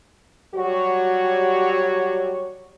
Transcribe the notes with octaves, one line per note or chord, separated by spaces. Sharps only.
F#3 G3 F#4 G4 C#5